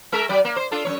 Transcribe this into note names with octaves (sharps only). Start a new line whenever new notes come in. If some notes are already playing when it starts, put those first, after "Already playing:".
G#3 A#4 E5
F#3 D5
A#3
C5
D4 F4 A4
F#2 A3 C#5